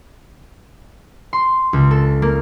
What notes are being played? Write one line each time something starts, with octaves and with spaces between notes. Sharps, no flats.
C6
C#2
A4
A#3